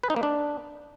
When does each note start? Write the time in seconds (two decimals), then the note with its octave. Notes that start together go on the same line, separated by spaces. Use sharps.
0.03 B4
0.10 D#4
0.16 A#3
0.23 D4